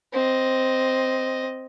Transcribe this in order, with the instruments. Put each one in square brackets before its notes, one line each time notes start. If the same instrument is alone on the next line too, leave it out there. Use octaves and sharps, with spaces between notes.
[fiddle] C4 D#5